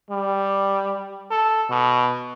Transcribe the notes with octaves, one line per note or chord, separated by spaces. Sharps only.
G3
A4
B2